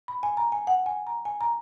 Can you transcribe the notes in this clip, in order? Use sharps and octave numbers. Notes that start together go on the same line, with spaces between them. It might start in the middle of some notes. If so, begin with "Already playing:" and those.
B5
G#5
A#5
G#5
F#5
G#5
A#5
G#5
A#5